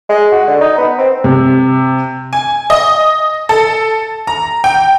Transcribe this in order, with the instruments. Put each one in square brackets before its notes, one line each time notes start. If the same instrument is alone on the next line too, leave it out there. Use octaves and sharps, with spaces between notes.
[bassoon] G#3
F#4
D3
D#4
B3
C4
[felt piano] C3
[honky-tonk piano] G#5
D#5
A4
A#5
G5